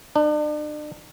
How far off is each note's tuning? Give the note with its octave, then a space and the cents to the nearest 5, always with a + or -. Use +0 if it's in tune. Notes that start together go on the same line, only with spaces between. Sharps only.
D4 +40